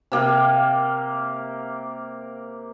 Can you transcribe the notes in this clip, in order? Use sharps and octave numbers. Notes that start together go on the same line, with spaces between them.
C3 A#3 G4 F5